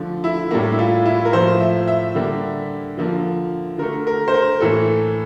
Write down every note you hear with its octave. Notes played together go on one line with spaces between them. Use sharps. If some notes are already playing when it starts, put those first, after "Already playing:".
Already playing: D3 F3 A3
E4
A2 G3 A#3
E4
F4
E4
A#4
A2 F3 A#3 C5
E5
E5
D3 G3 A#3
D3 F3 A#3
D3 A3 A#4
A#4
C5
A#4
A2 E3 A#3 A4